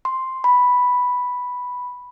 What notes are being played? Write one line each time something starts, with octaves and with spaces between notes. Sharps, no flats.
C6
B5